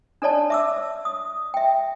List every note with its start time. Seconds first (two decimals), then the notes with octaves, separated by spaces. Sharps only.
0.22 D4 A4 C#5 D5 A5
0.50 E5 D6 E6
1.05 D#6
1.54 E5 G5